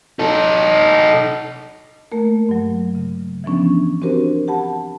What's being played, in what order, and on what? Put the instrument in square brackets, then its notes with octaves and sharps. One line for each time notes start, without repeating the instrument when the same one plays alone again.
[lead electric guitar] D#4 A4
[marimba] A3 A#3 A#4
G2 F#3
C#3
E3 F3 B3 C#4 D4
C4 D4 F#4 G4 A#4 C5
G4 F#5 A5 B5